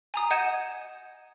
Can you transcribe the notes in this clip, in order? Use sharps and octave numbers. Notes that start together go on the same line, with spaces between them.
G#5 A#5 D#6
D#5 F#5 G6 G#6 D#7 E7